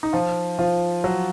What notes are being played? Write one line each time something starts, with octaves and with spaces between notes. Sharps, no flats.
D#4
F3 F4
F3 F4
F#3